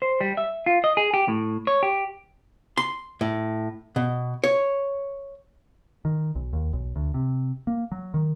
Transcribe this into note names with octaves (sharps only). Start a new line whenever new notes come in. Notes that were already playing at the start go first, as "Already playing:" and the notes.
C5
G3
E5
F4
D#5
G#4
G4
A2
C#5
G4
C6
A2
B2
C#5
D#3
B1
D#2
B1
D2
C3
A#3
F#3
D#3